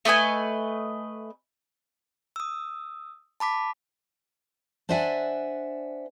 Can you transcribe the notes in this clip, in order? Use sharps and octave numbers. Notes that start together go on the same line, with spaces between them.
A3 B4 D#5 G#5
D#6 E6
A5 B5 D6 B6
D4 C5 D5 E5 F#5 G#5